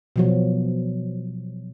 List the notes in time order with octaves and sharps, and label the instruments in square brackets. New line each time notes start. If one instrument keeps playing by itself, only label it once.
[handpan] B2 F3 F#3